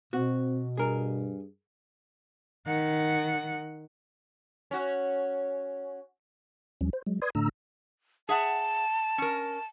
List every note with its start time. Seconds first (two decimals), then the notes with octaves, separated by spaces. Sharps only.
0.13 B2 C4 F#4
0.77 G2 G#4 A#4
2.67 D#3 F#5
4.71 C#4 F#4
6.81 D#2 F3 G3 C#4
6.93 C5
7.07 F#3 G#3
7.22 B4 D5 C6 D#6 G#6
7.35 A2 D3 A3 D4 A#5 E6
8.29 G#4 E5 F#5 A5
9.18 C#4 A#4